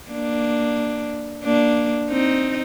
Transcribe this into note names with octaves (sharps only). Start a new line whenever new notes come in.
A#3 D4
A#3 D4
C4 D#4